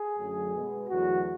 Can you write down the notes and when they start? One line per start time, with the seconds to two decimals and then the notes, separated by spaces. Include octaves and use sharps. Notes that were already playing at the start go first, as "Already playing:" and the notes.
Already playing: G#4
0.16 F#2 D3 F#3 A3
0.53 B2 G#3 B3
0.89 E2 D3 F#3 A3 F#4